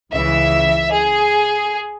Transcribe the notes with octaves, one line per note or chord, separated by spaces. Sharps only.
C#2 C#3 E3 E5
G#4